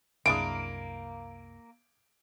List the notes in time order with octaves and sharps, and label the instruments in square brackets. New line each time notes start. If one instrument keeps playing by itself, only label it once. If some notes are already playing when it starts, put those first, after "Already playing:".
[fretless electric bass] C2 F#2 [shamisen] G#3 D4 E4 [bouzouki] A#3 [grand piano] D7